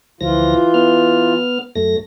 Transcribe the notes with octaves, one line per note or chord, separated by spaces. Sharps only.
D2 E3 F3 F4 A#6
B3 F6
F#2 A3 A#6